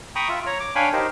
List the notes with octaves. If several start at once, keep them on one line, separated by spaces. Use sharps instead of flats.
G5 A#5 B5 C#6 D#6
F4 E5
C#5 A#5
D6
D4 C#5 F5 G5 G#5 B5
D#4 G4 A#4 C5